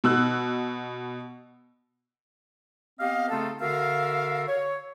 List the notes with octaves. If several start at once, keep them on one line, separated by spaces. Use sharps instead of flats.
B2 E6 F#6
B3 C4 G4 D#5 F5
C#3 A3 C4 D#4 F4 A4
D3 F#4 A#4 E5 F5
C#5